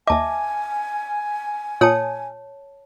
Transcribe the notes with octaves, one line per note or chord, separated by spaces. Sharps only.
D#2 D#5 E5 G#5 A5 D6
A#2 C#5 A5 D#6 C#7